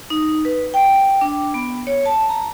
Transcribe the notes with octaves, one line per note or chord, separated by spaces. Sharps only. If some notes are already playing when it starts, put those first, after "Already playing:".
D#4
B4
G5
D4
B3
C#5
A5
A#5